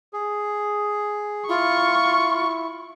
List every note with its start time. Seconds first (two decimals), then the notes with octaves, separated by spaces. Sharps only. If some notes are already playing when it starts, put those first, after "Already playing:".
0.13 G#4
1.48 E4 F4 C#6